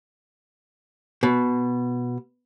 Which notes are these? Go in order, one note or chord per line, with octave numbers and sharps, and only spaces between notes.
B2